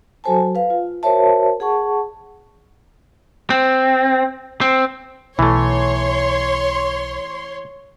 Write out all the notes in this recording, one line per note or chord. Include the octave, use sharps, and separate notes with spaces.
F#3 F#4 A4 C5 G#5 A5
B4 F5
F4
F#4 A#4 C5 C#5 E5 A5
G#4 F#5 A5 C#6
C4
C4
B1 E3 A3 C#5 C6